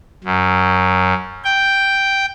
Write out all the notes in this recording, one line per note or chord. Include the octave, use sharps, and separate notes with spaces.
F#2
G5